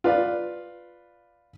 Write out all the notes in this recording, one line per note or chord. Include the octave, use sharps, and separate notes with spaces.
F4 B4 D5